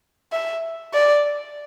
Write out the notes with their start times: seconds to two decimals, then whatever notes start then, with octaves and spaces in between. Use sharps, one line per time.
0.32 E5
0.94 D5